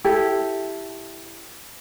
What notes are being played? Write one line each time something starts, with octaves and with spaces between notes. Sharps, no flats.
E4 G4 A4